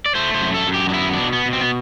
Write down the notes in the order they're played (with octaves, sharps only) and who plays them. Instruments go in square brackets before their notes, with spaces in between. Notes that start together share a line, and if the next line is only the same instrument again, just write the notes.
[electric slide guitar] D5
A3 C5
C5
F#2
A4
F#2
G4
D4
B3 E4
D4
B2
B3
B2
C4
B3